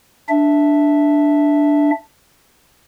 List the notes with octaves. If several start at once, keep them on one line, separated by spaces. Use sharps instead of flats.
D4 E5